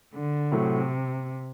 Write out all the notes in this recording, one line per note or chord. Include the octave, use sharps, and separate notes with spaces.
D3
A2 C3 F#3 A3